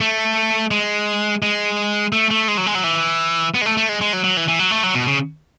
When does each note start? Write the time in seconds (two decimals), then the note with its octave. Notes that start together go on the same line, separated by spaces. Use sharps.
0.01 A3
0.71 G#3
1.42 G#3
2.13 A3
2.31 A3
2.48 G#3
2.57 F#3
2.66 G#3
2.75 F#3
2.84 E3
3.55 B3
3.61 G#3
3.66 A3
3.77 A3
3.89 G#3
4.01 G#3
4.13 F#3
4.24 F#3
4.37 E3
4.48 E3
4.59 F#3
4.71 A3
4.83 F#3
4.95 B2
5.07 C#3